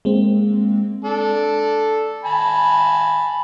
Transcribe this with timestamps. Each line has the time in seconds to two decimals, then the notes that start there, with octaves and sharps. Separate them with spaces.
0.05 G#3 A#3 C4
1.05 D4 A4
2.24 G#5 A5 B5